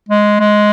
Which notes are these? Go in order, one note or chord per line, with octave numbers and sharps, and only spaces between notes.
G#3
G#3